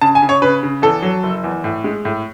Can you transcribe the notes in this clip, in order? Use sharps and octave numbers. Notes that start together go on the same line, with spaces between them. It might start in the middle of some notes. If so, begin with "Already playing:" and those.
C#3 A5
G#5
C#3
C#5
C#3 B4
C#3
E2 A4
F#3
F#1
E2
A2
G#3
A2